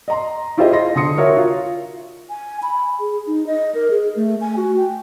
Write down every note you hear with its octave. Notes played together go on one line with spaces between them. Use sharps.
D#5 A#5 C6
E4 F4 G4 G#4 C5 D#5
D#5 C6 A#6
D3 C6 D#6 C#7
F#4 A#4 C#5 E5
F4
G#5
B5
G#4
D#4
D#5
A#4
G#4
A3
G#5
F#4
G5